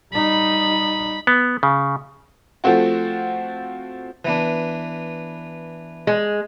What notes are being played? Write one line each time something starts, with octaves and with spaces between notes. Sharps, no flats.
G3 D#4 B5
B3
C#3
F3 A3 C4 F#4
E3 B3 D4
G#3